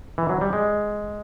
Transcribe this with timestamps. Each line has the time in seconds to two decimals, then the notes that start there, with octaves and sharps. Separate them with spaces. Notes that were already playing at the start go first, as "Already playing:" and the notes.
0.18 E3
0.29 F#3
0.41 G3
0.53 G#3